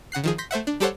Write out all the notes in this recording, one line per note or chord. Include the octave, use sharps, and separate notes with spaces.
C#3 F#5 F#6 C7
D#3 F3 G#4
C6 G6 A#6 B6
A3 C5 E5 F#5
D4
G3 G4 A4 C5 C#5 F#5